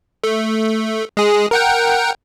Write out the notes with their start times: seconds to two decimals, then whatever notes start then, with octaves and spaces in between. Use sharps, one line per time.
0.24 A3
1.17 G#3 G#4
1.51 A#4 F#5 G5